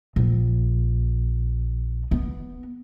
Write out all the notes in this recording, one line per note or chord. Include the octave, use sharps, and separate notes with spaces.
A#1
B3